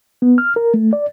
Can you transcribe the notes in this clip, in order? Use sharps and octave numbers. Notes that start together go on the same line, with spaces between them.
B3
F6
A#4
A3
D5